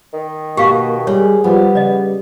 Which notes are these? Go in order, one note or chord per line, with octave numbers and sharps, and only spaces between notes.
D#3
B2 A#3 G4 F5 C#6
G3 G#4 C#5
F3 G3 B3
C#3 D5 D#5